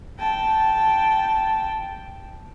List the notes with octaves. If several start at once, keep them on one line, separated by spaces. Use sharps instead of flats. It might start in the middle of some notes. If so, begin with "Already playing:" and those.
G5 A5